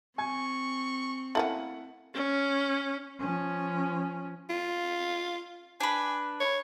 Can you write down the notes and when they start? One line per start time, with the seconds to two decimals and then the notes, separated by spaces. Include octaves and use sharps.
0.18 C4 G#5 C#6 G#6
1.35 A3 A#3 C#4 E4 F#5 F#7
2.14 C#4
3.19 F3 C#4
4.50 F4
5.80 D4 B4 G#5
6.41 C#5